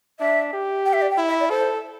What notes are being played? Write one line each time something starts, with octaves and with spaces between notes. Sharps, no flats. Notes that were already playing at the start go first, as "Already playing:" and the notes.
D4 E5
G4
G5
E5
D5
G5
E4
E5
D5
A4 C5